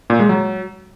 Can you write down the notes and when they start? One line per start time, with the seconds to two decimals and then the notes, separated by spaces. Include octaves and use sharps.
0.10 A#2
0.19 G#3
0.29 F#3